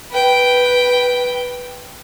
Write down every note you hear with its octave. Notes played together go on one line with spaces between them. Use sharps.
B4 G5